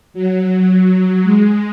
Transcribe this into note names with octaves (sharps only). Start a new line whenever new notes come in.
F#3
G#3